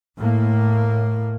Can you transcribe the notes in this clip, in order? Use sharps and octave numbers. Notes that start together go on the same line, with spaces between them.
A2 A#3